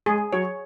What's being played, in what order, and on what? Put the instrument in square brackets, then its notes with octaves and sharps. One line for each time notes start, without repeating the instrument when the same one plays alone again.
[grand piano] G#3 [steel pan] G#4
[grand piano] F#3 [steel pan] C#5